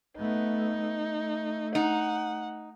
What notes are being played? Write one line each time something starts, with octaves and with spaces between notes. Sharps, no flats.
A3 B3 D#4
A3
D#4 F#5